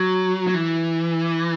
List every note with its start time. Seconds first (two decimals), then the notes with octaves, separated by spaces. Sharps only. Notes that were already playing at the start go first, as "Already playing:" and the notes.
Already playing: F#3
0.47 F#3
0.54 E3